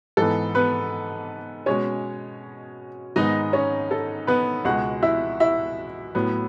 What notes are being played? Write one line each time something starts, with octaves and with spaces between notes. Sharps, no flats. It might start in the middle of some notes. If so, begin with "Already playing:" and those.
G#2 E3 B3 A4
B3 B4
B2 G#3 C#4 C#5
G#2 D#3 G#3 B3 D#4 D#5
C#4 C#5
A4
B3 B4
C#2 B2 G#3 F#4 F#5
E4 E5
E4 E5
A2 F#3 B3